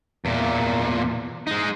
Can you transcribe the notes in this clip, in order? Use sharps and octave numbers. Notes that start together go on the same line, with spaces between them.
E2 A#2
G#3 D#4